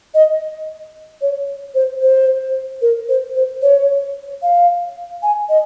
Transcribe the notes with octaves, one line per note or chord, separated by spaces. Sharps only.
D#5
C#5
C5
C5
A#4
C5
C5
C#5
F5
G#5
D#5